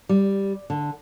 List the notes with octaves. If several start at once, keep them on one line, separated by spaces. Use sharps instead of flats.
G3
D3